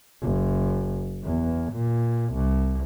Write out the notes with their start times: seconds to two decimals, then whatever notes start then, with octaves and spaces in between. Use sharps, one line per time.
0.23 F#1
1.24 E2
1.73 A#2
2.34 C2